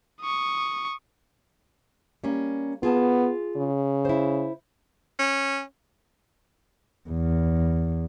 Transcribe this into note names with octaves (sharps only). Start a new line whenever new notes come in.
C#6 D#6
G3 A#3 C#4
B3 F4 G#4 A5
C#3
E4 C5
C#4
E2